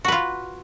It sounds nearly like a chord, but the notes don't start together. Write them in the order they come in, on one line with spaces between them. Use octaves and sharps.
F#4 B4 F4